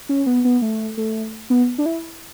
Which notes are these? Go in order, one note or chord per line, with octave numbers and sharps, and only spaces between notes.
C#4
B3
B3
A3
A3
B3
D4
E4